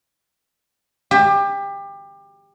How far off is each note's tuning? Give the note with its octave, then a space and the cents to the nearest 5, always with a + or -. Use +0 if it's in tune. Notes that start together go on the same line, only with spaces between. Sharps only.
G4 +25